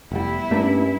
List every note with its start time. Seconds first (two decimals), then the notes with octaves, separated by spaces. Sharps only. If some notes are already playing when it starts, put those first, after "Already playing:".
0.12 F1 G3 B3 E4
0.51 G2 A3 A#3 C#4 D4